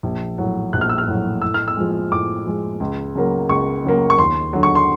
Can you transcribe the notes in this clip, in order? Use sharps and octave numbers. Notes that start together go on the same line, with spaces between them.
A#1
A2 F#3
A#1 F#6
F6
E6
F6
A2 F#3
A2 E6
F6
E6
F3 G#3
A2 D6
F3 G#3
C#2
C#3 F#3 A#3
C#2 C#6
C#3 F#3 A#3
C#6
D#2 C6
D3 F#3
C#6
C6